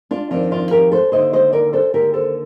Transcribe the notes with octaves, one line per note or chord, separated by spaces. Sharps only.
D4 F4
F2 D#3 D4 F4
D4 F4
G4 A#4
A4 C5
D#2 D3 C5 D#5
C5 D#5
A#4 D5
A4 C5
D#2 D3 G4 A#4
A4 C5